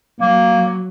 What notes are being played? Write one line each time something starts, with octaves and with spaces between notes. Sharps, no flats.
F#3 A#3